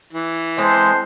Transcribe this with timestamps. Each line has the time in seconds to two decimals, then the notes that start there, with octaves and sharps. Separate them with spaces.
0.13 E3
0.58 G#3 C4 A4 C5 A5